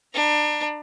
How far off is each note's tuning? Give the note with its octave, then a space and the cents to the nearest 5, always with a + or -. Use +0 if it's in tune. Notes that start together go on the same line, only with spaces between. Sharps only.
D4 +25 A#5 +35